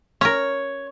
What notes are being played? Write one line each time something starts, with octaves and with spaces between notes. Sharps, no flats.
C#4 A#4 C#5